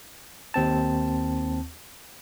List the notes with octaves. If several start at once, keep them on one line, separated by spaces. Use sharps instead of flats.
D#2 C4 A5